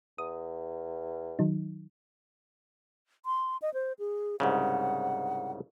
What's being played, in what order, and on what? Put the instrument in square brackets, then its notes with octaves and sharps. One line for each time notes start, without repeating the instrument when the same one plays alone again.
[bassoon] E2 [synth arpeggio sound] D#6
[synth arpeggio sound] D#3 F#3 D#4
[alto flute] C6
D#5
C5
G#4
[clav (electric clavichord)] C2 G#2 C#3 [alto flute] F#5